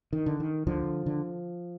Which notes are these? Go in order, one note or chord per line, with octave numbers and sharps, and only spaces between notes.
D#3
D3
D#3
D2 D3 F3
D3